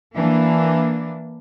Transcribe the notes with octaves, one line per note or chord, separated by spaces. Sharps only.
E3 A#3 D4